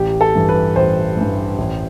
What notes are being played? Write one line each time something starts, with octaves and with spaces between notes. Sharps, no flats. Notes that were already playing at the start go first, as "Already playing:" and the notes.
Already playing: A1 G4
A4
G2 E3
B4
A1 C5
G2 E3
A1